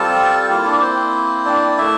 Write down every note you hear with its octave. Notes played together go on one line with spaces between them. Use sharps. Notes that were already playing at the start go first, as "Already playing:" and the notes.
Already playing: G3 C4 F4 A4 A5
A#3 E4 F4 F5
D4 D5
C4 C5
D4 D5
A3 E4 E5